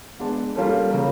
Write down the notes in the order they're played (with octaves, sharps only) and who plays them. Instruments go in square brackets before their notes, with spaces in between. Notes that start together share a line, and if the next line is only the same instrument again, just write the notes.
[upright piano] G#3 B3 D4
G3 A#3 C#4 F4 A4
C#3 F#3 A#3